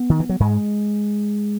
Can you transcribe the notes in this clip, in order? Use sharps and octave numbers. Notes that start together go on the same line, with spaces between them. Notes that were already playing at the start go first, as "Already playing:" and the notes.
Already playing: B3
D#3
E3
F#3
G#2 G#3